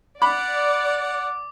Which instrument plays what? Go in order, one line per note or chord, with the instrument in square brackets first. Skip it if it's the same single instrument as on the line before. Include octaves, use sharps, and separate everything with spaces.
[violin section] D5 [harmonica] F#5 [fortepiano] B5 [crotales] D6